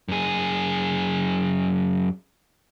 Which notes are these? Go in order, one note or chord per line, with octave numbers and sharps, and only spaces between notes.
F#2 G#4